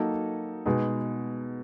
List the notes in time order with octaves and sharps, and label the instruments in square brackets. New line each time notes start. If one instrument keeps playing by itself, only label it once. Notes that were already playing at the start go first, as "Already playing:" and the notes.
Already playing: [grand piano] F#3 A#3 D#4 F#4 A4
B2 G#3 B3 D#4 G#4